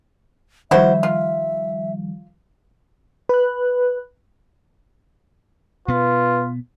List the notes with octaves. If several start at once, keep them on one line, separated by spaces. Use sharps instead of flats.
D#3 F3 G3 E4 F#4 C5 E5
F4
B4 F#6
B2 B3 F4 B4